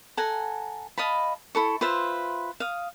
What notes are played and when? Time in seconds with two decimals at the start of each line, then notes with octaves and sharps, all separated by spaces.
0.17 A4 F#5 G#5 A#5
0.98 D#5 F5 A5 B5
1.55 E4 A4 C#6
1.81 F4 B4 C5 E5
2.60 F5 D#6